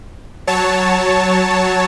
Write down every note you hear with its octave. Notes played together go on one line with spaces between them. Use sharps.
F#3 C#5 A5